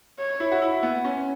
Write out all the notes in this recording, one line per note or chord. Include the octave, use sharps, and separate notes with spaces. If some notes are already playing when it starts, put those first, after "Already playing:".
C#5
E4
F#4
E4
B3
C#4